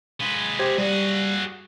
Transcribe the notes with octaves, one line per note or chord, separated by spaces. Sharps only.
G#3 B4
G4 C5 G#6
G3 F#4 G#4